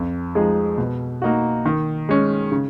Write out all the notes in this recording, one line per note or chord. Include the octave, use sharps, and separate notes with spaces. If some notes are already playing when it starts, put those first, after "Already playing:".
Already playing: F2
F3 G#3 D#4 G#4
B2
A#3 D#4 F#4
D#3
G#3 C#4
C#3